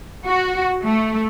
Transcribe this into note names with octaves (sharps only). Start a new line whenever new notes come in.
F#4
A3